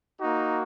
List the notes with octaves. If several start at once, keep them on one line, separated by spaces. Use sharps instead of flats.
A#3 D#4 F#4